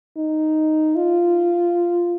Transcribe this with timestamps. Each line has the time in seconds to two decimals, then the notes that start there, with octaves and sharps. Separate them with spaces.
0.17 D#4
0.96 F4